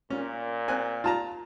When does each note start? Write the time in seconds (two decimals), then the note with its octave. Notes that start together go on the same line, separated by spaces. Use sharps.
0.10 A#2 C#4
0.68 C4 G#5 F#6
1.04 F4 A5 A#5